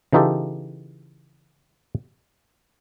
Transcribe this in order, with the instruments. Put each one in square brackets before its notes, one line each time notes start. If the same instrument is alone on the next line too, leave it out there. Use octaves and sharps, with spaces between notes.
[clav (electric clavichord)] C#3 E3 D#4 F4 G4 A4